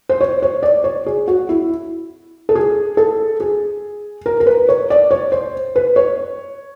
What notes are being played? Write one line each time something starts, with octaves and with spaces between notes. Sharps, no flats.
C5
C#5
C#5
D5
C#5
G#4
F#4
E4
A4
G#4
A4
G#4
A#4
A#4
B4
C#5
D5
C#5
C5
B4
C#5